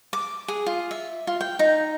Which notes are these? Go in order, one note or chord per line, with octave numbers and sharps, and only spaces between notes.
D6
G#4
F4
E5
F4
G5
D#4